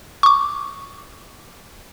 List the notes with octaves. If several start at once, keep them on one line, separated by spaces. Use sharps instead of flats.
C#6 D6